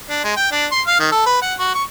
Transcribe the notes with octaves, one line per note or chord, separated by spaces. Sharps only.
D4
G#3
G5
D4
C6
F5
D#3
A4
B4
F#5
F#4
C#6